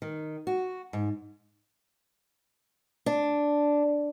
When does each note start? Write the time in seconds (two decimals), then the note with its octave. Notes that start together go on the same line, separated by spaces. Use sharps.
0.02 D#3
0.47 F#4
0.93 G#2
3.06 D4